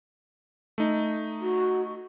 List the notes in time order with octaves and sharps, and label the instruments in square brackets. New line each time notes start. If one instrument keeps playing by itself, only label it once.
[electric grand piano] A3 D#4
[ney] F#4